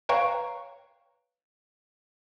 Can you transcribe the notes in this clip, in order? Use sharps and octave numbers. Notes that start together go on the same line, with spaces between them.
B4 C#5 F5 G5 A#5 C#6